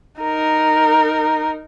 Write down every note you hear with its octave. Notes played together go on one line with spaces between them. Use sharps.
D#4 A#4